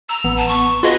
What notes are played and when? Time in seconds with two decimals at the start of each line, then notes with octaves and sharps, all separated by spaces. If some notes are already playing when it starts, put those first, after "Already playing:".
0.09 A#5 E6
0.24 A1 B3
0.37 A5
0.48 C#6
0.83 F4 F#4 G#4 B4 D#5